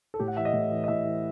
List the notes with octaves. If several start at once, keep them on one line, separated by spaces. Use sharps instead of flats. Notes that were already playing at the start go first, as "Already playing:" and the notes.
A4
A2 G4
F#5
E3 E5
D#5
A2
E3
D#5
A2 E5
E3